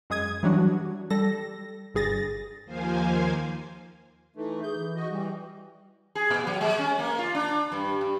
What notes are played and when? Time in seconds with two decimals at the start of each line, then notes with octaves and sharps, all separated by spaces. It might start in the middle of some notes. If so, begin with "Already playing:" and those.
0.10 F#2 G#3 D#6 G#6
0.43 E3 F#3 G3 D4 F#4
1.10 G3 A4 A#6
1.95 G1 G2 G#4 A6 A#6
2.64 D#2 F3 A#3 C5 F5 G#5
4.35 E3 A3 D#4
4.63 G#4 G6
4.78 E3
4.96 F#4 D#5
5.10 E3 G3
6.15 G#4
6.30 A#2
6.47 F#3
6.61 G#3
6.78 C#4
6.99 A#3
7.19 F4
7.35 D4
7.72 G2
8.01 G2